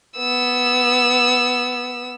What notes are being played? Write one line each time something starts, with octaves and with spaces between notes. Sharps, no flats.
B3 E6